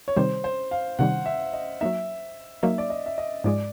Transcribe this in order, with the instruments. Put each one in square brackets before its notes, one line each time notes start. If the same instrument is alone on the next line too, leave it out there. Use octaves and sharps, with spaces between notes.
[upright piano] C#5
[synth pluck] C3 D#3 G3 [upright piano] C5
[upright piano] C5
F5
[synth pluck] C3 D#3 G3 [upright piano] F#5
[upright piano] E5
D#5
[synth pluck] F#3 A#3 D#4 [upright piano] E5
[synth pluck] F#3 A#3 D#4 [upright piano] E5
[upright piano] D5
D#5
E5
D#5
[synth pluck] G#2 F3 G#3 [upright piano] D5